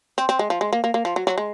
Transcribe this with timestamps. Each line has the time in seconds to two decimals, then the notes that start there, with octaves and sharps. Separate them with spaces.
0.18 C4
0.29 C4
0.39 G#3
0.50 F3
0.61 G#3
0.73 A#3
0.84 A#3
0.94 A#3
1.05 F3
1.16 F#3
1.27 F#3
1.38 G#3